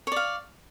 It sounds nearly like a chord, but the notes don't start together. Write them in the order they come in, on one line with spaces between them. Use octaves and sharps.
C#5 D5 F5